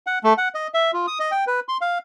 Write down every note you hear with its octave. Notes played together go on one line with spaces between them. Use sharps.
F#5
A3
F#5
D#5
E5
F4
D#6
D#5
G5
B4
C6
F5